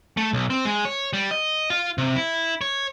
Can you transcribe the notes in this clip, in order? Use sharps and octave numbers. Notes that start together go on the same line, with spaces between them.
A3
B1
C4
G#3
C#5
G3
D#5
F4
C3
E4
C#5